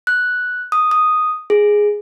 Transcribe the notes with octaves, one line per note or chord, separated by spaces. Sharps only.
F#6
D#6
D#6
G#4